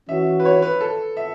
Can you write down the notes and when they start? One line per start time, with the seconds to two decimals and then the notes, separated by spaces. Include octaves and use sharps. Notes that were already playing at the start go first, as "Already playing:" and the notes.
0.08 E3 C#4 F#4 E5
0.40 B4
0.45 C#5
0.62 B4
0.81 A4
1.17 E5